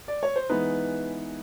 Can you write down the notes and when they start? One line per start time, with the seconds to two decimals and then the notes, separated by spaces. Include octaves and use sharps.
0.08 D5
0.23 C#5
0.36 C5
0.49 E3 G#3 B3 D#4 B4